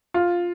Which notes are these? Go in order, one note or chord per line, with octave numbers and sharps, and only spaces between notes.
F4